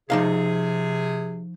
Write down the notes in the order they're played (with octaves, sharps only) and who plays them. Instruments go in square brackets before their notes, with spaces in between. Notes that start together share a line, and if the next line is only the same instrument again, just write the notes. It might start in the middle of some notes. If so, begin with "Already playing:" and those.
[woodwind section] C3 G#4 [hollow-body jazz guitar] F3 D#4 F5